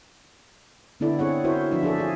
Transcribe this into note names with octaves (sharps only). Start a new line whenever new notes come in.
D3 B3 D4 E4 A4 D5
C4 G#4 C#5 F#5
E4 F#4 A#4 C5 C#5 E5
F3 D4 F4 F#4 E5
D4 G#4 A4 E5
F4 G#4 D5